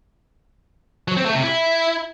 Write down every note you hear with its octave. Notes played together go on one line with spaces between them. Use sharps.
F#3
C4
A3
C3
E4